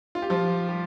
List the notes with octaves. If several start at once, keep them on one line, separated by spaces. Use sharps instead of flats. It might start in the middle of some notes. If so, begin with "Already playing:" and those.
F4
G4
F3 F4
G3 G4